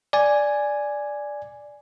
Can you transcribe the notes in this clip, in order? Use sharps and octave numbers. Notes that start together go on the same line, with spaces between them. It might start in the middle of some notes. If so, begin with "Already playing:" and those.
D5 G#5